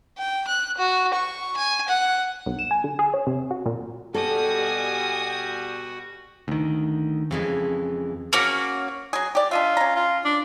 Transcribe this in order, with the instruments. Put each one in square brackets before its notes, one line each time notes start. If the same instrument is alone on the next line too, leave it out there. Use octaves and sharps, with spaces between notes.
[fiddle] G5
F#6
F#4
C#6
G#5
F#5
[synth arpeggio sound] B1
E7
G#5
D3
G#4
C#5
C3
F#4
A#2
[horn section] B2 G3 [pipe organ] F#4 [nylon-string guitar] A4 [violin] G#5 D#6
[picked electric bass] D2 D#3
[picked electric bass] F2 [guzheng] C#3 E3 G#3
[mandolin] A#3 C#4 F#4
[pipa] F#3 G#4
G4 D5
[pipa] D4 D#5 E5 [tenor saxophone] F4
[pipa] C#4 A#5
[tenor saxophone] F4
D4